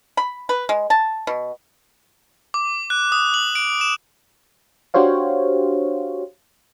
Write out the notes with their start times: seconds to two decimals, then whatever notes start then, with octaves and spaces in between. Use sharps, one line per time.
0.17 B5
0.49 B4
0.69 G#3
0.90 A5
1.27 B2
2.54 D6
2.90 F#6
3.12 D#6
3.34 F#7
3.55 D7
3.81 E7
4.94 D4 F#4 G4 C5 C#5 F5